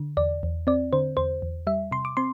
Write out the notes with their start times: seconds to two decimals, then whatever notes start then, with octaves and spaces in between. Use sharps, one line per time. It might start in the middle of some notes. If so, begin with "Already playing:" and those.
Already playing: D3
0.17 E2 D5
0.43 E2
0.67 C4 D5
0.93 D3 C5
1.17 E2 C5
1.42 E2
1.67 G3 E5
1.91 C3 C6
2.05 D6
2.17 C4 C6